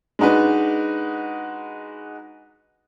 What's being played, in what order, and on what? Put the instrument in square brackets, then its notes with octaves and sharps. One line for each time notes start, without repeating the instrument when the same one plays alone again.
[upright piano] G#3 D4 D#4 F#4 B4